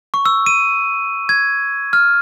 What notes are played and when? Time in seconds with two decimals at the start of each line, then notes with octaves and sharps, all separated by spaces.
0.14 C#6
0.26 E6
0.46 D#7
1.29 G#6
1.93 F6